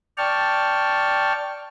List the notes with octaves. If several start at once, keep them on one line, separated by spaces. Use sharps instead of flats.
D5 G5 A5 C#6 F6